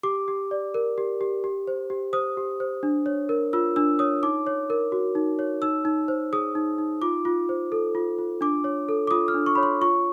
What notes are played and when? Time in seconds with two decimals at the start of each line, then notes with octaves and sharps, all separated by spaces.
0.03 G4 D6
0.28 G4
0.51 D5
0.74 A#4
0.98 G4
1.21 G4
1.44 G4
1.67 C5
1.90 G4
2.13 C5 D#6
2.37 G4
2.60 C5
2.83 D4
3.06 C#5
3.29 A#4
3.53 F4 E6
3.76 D4 E6
3.99 C#5 D#6
4.23 D#4 D6
4.47 C#5
4.70 A#4
4.92 F#4
5.15 D#4
5.39 C#5
5.62 D#4 E6
5.85 D#4
6.08 C5
6.33 G#4 D#6
6.55 D#4
6.78 D#4
7.02 F4 D6
7.25 F4
7.49 C5
7.72 A4
7.95 F4
8.18 F4
8.41 D4 D6
8.64 C#5
8.89 A4
9.07 D6
9.11 F4 D#6
9.28 F6
9.34 D4
9.46 C#6
9.55 C#5 B5
9.63 C6
9.81 F4 C#6